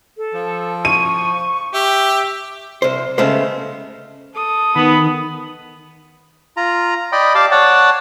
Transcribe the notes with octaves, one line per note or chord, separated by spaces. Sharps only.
A4
F3
C#6 D#7
G4 E5
C2 C5
C#3 G#3 A3 B3 C5
A4 D#6
D#3 B3 B5
F4 A#5
D5 D#5 G5 B5
G4 D5 F5 A5
C#5 D5 F#5 A5